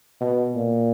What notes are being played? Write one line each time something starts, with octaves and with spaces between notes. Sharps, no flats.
B2
A#2